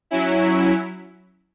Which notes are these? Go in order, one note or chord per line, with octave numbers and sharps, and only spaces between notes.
F#3 C#4 E4